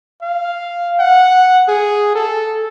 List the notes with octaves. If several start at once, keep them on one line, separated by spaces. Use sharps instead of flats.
F5
F#5
G#4
A4